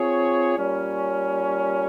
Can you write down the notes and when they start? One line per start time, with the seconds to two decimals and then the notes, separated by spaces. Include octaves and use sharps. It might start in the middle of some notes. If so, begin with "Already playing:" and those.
Already playing: C4 F4 G#4 C#5
0.57 A#2 G3 C#4